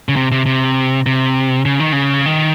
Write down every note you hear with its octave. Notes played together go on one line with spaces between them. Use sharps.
C#3
C3
C3
C3
C3
C#3
D#3
C#3
D#3